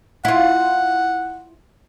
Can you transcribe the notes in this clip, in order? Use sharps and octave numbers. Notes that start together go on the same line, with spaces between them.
E4 F4 F#5